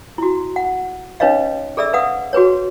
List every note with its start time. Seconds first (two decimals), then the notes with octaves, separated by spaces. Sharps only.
0.18 E4 F#4
0.56 F#5
1.20 C#4 D#4 B4 C#5 D#5 F5
1.77 G#4 A4 D5 E5 E6
1.93 B4 F5 F#5 D#6
2.33 F#4 G#4 B4 C#5